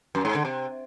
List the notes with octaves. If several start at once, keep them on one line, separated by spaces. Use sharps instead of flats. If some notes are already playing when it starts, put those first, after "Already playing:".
F#2
G#2
D3
C3